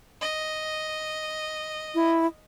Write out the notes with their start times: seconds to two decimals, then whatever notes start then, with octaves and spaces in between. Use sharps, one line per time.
0.21 D#5
1.95 E4